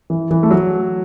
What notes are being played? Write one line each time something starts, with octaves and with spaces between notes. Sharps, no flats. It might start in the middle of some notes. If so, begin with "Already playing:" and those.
E3
E3
A3
F#3